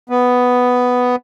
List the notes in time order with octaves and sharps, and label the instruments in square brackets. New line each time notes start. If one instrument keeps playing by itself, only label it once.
[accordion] B3